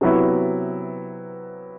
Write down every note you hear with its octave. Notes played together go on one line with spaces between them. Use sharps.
C3 F#3 B3 E4